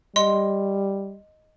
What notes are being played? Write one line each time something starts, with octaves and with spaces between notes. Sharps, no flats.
G3 D#5 C6